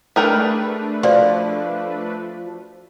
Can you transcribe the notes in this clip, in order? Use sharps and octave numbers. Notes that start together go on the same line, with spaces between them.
A3 D4 G#4 A#4 B4 G5
F3 D5 F5 C6